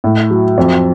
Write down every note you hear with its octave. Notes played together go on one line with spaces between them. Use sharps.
A2
F#3
F2